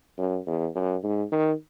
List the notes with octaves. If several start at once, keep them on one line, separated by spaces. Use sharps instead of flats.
F#2
E2
F#2
G#2
D#3